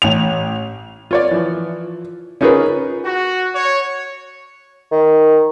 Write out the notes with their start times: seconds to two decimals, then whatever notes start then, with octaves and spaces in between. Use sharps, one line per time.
0.02 A1 F7
1.11 F4 C#5 D5
1.31 E3 F3
2.41 C#4 D#4 F4 G#4 A#4 B4
3.04 F#4
3.54 C#5
4.92 D#3